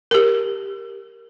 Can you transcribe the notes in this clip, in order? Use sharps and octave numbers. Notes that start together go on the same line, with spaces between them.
G4 A#4